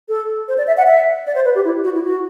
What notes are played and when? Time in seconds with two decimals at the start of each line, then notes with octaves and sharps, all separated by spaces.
0.09 A4
0.48 C5
0.58 D5
0.67 E5
0.77 F#5
0.87 E5
1.27 D5
1.35 C5
1.45 B4
1.55 G4
1.65 E4
1.84 F#4
1.94 E4
2.04 F#4